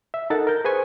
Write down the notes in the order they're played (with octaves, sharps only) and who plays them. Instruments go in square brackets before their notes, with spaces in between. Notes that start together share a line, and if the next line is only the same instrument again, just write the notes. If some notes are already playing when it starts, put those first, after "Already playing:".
[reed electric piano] E5
D#4 A4 A#4 F#5 A6
A#4 G6
G#4 B4 C5 G#5 C#6